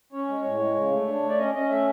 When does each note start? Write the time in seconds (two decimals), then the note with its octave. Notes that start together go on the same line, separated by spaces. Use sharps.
0.12 C#4 C#5
0.28 G#3
0.44 A2
0.60 G#3
0.76 C#3
0.91 A3
1.07 D4
1.23 A3
1.29 D5
1.38 C#4 D#5
1.54 C#4 D#5
1.69 A3 E5